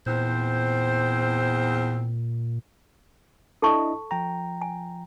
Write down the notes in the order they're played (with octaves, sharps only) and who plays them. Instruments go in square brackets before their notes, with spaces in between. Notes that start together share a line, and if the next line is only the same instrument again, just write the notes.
[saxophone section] E2 C4 C5 [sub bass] A#2
[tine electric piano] D4 E4 D#5 [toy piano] A4 A5 C#6
[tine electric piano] F3 G5 A#5
[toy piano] G#5